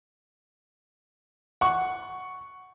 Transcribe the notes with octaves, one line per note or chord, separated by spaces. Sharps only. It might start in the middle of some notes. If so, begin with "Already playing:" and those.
F#5 C#6